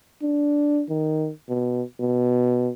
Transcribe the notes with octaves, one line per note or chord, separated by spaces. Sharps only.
D4
D#3
B2
B2